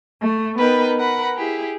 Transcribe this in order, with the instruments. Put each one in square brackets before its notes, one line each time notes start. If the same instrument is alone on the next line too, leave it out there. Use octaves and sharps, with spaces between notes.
[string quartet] A3
B3 D#4 A#4 B4 G5
A#4 B4 F#5 B5
E4 G4 G#4